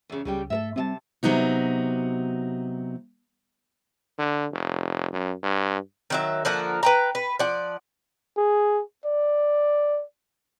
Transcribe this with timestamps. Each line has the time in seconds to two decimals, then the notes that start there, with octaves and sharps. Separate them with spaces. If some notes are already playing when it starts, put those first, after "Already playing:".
0.10 E2 C#3
0.25 C#2 C#3 G3 G4
0.50 G#2 A3 A4 A#4 E5
0.76 C3 G3 A#3 C4 D#5 A5
1.23 C3 F#3 B3 D#4 F#4
4.19 D3
4.53 F1
5.12 F#2
5.43 G2
6.10 D#3 F#3 E5
6.45 D3 F3 A#3 F#5
6.83 B4 G5 A#5
7.15 B4
7.39 F3 D5 F#5
8.37 G#4
9.05 D5